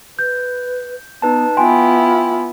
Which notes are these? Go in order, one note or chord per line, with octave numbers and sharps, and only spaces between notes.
B4 G6
B3 D#4 B4 A5
B3 E4 F4 G5 G#5 C6